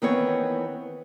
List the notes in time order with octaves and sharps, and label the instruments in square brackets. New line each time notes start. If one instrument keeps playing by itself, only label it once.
[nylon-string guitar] D#3 E3 B3 C4 A#4 C#5